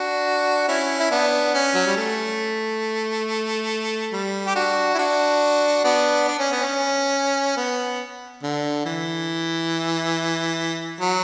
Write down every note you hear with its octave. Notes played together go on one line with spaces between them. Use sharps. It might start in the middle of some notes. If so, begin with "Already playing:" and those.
Already playing: D4 F#4
C#4 E4
E4
B3 D4
C#4
F#3
G3
A3
G3
G4
D4 F#4
E4
D4 F#4
B3 D4
D4
C#4
B3
C#4
B3
D3
E3
F#3